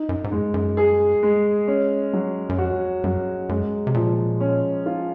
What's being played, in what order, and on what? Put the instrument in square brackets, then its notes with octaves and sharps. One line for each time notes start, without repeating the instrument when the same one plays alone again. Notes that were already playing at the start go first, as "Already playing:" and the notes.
Already playing: [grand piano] D#4
[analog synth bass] F#2
G#2
[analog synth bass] F#2 [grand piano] G#3
[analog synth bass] F#2
[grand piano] G#4
G#3
C#4
F#3
[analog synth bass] F#2
[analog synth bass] F2 [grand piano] F#4
[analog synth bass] F#2 [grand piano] F#3
[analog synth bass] F#2 [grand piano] G#3
[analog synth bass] C3
[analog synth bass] A#2 [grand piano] F3
[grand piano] C#4
F4